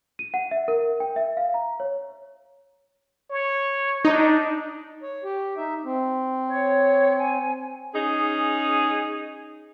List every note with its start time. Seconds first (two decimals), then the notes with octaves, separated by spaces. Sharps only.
0.19 D#7
0.34 F#5
0.51 E5
0.68 A#4
1.00 G5
1.16 E5
1.37 F5
1.54 A#5
1.80 C#5
3.31 C#5
4.05 D4 D#4
5.03 C#5
5.24 G4
5.57 D#4 E5
5.85 C4
6.48 C#5
7.18 G#5
7.95 C#4 D#4 G#4